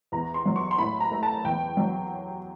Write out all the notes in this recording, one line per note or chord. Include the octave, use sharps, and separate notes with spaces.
E2 A#5
C6
F#3
C#6
C6
A2 B5
A#5
A3
A5
E2 G5
F#3